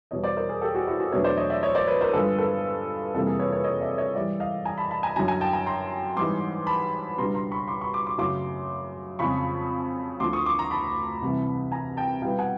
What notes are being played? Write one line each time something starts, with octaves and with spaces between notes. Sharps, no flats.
E2 B2 G3 C#5 D#5
C5 D5
A#4 C5
G#4 A#4
G4 A4
F#4 G#4
E4 F#4
F#4 G#4
E2 B2 F#3 A3 D4 B4 C#5
C5 D5
C#5 D#5
D5 E5
C#5 D#5
C5 D5
B4 C#5
A#4 C5
G2 D3 F3 G#3 B3 A4 B4
A4 B4
F2 C3 E3 G3 A#3 A4 B4
G#4 A#4
B4 C#5
B4 C#5
C#5 D#5
D5 E5
C#5 D#5
G#2 E3 G3 D5 E5
D#5 F5
G#5 A#5
A5 B5
A5 B5
G#5 A#5
F#2 D3 F#3 G#5 A#5
G#5 A#5
G5 A5
G#5 A#5
A#5 C6
G#2 E3 G3 B3 D#4 C6 D6
A5 B5
C#2 B2 G3 B3 D4 A#5 C6
A#5 C6
B5 C#6
C6 D6
B5 C#6
C6 D6
C6 D6
F#2 C#3 F#3 A3 C6 D6
F2 C#3 F3 G#3 B5 C#6
D2 D3 F3 C6 D6
C#6 D#6
C6 D6
A#5 C6
A5 B5
C2 C3 E3
G#5 A#5
G5 A5
B2 G3 B3 E4 F5 G5
F#5 G#5